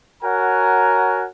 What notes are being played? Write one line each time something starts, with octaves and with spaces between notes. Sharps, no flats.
F#4 A#4 C#5 F#5 G#5 A#5